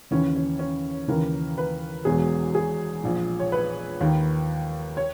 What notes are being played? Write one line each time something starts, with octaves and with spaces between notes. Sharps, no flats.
D#2 C#3 E3 C#4
C#4
C#4
D#2 C#3 E3 A#4
B4
E1 E2 B2 G#4
G#4
A#1 A#2
C#5
B4
D#2 D#3
C#5